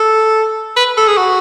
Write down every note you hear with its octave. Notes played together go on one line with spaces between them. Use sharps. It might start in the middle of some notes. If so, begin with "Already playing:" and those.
Already playing: A4
B4
A4
G#4
F#4